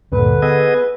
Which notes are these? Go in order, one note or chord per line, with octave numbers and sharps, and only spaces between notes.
D2 G2 A#2 D3 B4
B3 G#4 D#5 F#5 E6